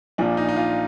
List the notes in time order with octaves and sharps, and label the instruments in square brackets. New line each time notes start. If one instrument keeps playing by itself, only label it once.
[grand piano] A#1 A#2 F3 D4
D#4
D#4
F4